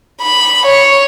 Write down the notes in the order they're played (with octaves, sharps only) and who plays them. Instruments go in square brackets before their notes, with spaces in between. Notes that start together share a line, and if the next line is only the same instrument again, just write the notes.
[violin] B5
C#5